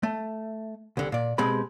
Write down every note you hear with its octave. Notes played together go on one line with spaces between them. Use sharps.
A3
C2 D3
A#2 D5
B2 G#3 C4 G4 B5